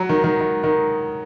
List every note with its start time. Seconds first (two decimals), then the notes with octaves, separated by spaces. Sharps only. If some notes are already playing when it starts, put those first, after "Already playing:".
Already playing: F#3
0.09 D#3
0.24 D#3
0.40 D#3
0.64 D#3